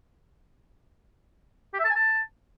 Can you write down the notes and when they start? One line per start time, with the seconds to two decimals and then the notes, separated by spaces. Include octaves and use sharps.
1.74 G4
1.79 E5
1.85 A5
1.90 G#5
1.96 A5